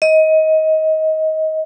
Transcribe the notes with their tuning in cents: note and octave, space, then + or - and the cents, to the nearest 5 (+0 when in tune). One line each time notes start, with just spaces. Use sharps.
D#5 +20